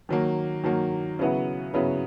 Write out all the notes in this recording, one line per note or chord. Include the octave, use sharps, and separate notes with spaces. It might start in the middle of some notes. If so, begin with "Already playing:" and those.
D#3 F#3 A#3
D#3 F#3 A#3
C#3 F#3 B3 E4
C#3 F#3 B3 E4